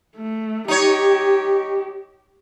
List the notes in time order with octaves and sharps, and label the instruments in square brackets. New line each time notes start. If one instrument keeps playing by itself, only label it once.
[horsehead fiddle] A3
[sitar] D#4 C#5 [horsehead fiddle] G4